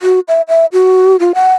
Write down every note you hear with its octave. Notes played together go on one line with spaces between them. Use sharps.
F#4
E5
E5
F#4
F4
F#5